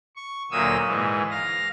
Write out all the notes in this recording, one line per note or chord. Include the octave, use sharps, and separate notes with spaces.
C#6
D2 A#2 F#3 A#3 D#6 E6
G#2 E3
F5 A#6